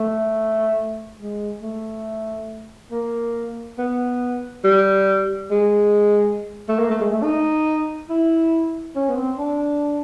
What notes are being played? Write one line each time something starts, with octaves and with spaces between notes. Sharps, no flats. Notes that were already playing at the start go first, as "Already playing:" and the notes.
Already playing: A3
G#3
A3
A#3
B3
G3
G#3
A3
A#3
A3
G#3
A3
D#4
E4
C#4
B3
C4
D4